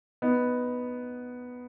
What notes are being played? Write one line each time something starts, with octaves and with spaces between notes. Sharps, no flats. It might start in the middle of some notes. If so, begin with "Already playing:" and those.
B3 D#4